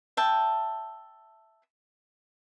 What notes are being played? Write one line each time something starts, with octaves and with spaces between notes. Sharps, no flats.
E5 G5 A5